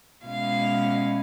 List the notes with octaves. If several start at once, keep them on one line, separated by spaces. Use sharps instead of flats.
B2 G#3 C#4 E4 F5